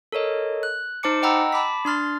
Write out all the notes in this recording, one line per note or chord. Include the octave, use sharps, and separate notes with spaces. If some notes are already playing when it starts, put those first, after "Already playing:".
A4 A#4 C#5 D#5
F#6
D#4 C5 A5 D6 C#7
D#5 F#5 G5 A#5 B5 E6
A5 B5 D6 B6
D4 C6 F6 A6